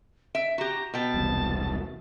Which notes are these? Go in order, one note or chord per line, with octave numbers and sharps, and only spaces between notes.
E5 D7
F#4 G4 A#5
B2 G5 A5
E1 C2